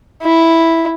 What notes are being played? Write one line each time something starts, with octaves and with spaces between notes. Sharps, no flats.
E4